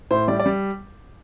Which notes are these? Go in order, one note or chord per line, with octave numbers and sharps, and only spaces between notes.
A2 C5
G3 D5
D5
G3